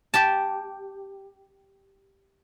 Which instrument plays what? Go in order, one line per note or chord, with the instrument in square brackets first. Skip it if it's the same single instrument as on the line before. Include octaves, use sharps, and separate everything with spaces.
[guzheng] G4 G5 A5